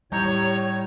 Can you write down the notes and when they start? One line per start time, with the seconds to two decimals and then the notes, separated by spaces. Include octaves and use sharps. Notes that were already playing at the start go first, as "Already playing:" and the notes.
0.12 A2 G3 C#5 A#5 C#6 G6